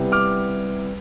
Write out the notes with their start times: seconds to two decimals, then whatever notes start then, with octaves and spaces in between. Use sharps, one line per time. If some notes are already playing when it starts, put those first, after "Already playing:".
Already playing: C3 G3 B3 E4
0.12 D6 F6